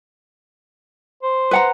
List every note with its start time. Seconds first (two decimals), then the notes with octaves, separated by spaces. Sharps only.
1.23 C5
1.51 B4 F#5 A#5